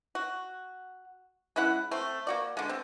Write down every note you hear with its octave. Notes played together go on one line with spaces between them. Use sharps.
F#4
G#3 C#4 E4 F#5
A3 C4
A#3 F#4 D5
D3 G#3
C4